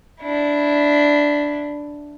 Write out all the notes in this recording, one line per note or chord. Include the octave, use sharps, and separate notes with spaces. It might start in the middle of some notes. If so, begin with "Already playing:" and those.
D4 E4